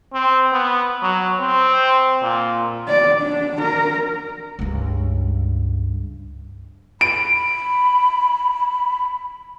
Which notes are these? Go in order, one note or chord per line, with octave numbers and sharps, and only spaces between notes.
C4
B3
F#3
C4
A#2
D5
D4
A#4
C#2 G2
B5 D7